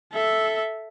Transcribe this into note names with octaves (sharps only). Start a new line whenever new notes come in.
A4 E5